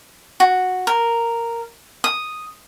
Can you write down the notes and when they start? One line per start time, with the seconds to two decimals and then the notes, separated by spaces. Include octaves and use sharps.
0.40 F#4
0.87 A#4
2.04 D#6